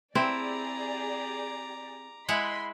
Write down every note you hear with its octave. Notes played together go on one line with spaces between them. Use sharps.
C4 E4 G4 G#4 D5 A#5 D6
G#3 E4 D#5 F#5 B5 C6